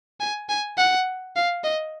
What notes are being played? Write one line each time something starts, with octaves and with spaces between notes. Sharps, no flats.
G#5
G#5
F#5
F5
D#5